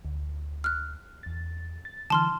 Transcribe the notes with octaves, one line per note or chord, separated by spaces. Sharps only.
D2
F6 F#6
E2 A6
A6
D3 E3 A5 C6 F6